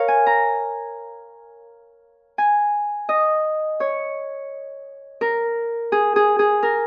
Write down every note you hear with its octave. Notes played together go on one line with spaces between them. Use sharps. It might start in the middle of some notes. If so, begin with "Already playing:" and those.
Already playing: A#4 C#5 F5
G#5
A#5
G#5
D#5
C#5
A#4
G#4
G#4
G#4
A#4